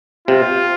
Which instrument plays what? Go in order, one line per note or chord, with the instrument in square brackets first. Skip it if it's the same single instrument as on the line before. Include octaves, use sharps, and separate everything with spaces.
[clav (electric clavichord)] C3 [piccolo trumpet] F4